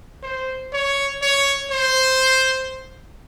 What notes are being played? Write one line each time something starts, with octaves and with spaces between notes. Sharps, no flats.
C5
C#5
C#5
C5